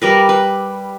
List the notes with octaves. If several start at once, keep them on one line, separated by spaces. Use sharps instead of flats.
G3 A#4 B4
B4